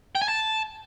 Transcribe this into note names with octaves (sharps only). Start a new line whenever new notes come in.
G5
G#5
A5